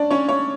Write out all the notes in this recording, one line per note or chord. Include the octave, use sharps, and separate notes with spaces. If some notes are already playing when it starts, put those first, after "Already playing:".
Already playing: C#4 D4 D5
C#4 C#5
C#4 C#5